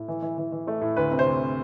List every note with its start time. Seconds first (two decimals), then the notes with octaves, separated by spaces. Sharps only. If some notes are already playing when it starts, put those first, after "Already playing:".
Already playing: A2
0.08 E3
0.22 E3
0.38 E3
0.52 E3
0.67 A3
0.81 A2
0.96 D2 B4
1.11 C3
1.19 C5
1.26 D2